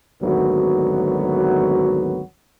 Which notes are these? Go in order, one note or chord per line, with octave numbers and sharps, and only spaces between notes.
G#1 D2 F#3 B3 F#4